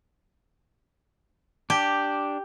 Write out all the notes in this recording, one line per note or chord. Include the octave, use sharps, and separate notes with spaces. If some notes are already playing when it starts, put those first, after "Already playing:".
D4 G4